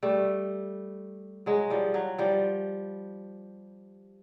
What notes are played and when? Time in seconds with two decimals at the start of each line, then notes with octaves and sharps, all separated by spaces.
0.03 G3 A3
1.46 F#3 G#3
1.70 F3 G3
1.94 F#3
2.18 F3 G3